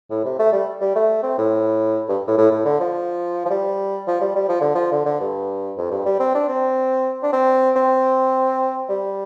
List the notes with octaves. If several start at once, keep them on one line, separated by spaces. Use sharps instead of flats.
A2
C3
A3
G3
G3
A3
C4
A2
G2
A2
A2
A2
D3
F3
F3
G3
F3
G3
G3
F3
D3
F3
D3
D3
G2
F2
G2
G3
C4
D4
C4
D4
C4
C4
G3